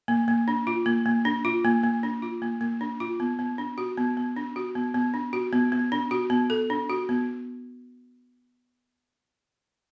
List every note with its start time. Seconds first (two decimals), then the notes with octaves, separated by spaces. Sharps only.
0.08 A#3
0.28 A#3
0.48 D4
0.67 F4
0.86 A#3
1.06 A#3
1.25 D4
1.45 F4
1.65 A#3
1.84 A#3
2.03 D4
2.22 F4
2.42 A#3
2.61 A#3
2.81 D4
3.00 F4
3.20 B3
3.39 B3
3.58 D4
3.78 F#4
3.97 B3
4.17 B3
4.37 D4
4.56 F#4
4.75 B3
4.94 B3
5.14 D4
5.33 F#4
5.53 B3
5.72 B3
5.92 D4
6.11 F#4
6.30 B3
6.50 A4
6.70 D4
6.90 F#4
7.09 B3